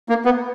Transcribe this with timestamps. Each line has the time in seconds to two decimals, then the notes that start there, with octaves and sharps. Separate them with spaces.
0.09 A#3
0.25 B3